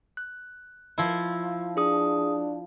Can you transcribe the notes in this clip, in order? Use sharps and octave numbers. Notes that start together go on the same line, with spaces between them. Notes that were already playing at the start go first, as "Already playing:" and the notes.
F#6
F3 E4
D4 G#4 D#6